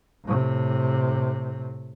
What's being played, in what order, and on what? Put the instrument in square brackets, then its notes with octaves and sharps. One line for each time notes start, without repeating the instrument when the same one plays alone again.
[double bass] A2 C3